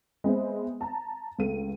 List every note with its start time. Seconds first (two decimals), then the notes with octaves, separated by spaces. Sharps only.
0.24 G#3 B3 C4 E5
0.81 A5 A#5
1.39 C#2 A3 D#7